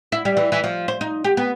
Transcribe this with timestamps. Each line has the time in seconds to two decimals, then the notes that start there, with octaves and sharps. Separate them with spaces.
0.12 E4
0.25 G3
0.37 E3
0.52 E3
0.64 F3
0.88 C5
1.01 D#4
1.24 G4
1.37 B3